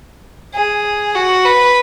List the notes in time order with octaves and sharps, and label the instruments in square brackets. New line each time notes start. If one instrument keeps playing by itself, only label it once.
[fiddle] G#4
F#4
B4